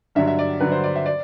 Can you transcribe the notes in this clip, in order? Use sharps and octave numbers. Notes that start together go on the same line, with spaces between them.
G2 D3 F#3 E5
E5
D5
G2 D3 F#3 B4
C5
D5
E5
D5